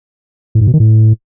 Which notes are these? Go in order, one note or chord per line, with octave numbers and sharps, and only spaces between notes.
A2
G#2
B2
D#3
A2